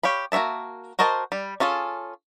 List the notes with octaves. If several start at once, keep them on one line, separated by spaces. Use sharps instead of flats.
G4 C#5 F5 B5
A#3 F#4 C#5 E5 A5
F#4 A#4 C5 D#5 A5
G3
C#4 F4 G#4 A4